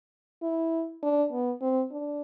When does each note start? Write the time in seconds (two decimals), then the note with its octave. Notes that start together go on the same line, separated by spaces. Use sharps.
0.42 E4
1.03 D4
1.33 B3
1.61 C4
1.92 D4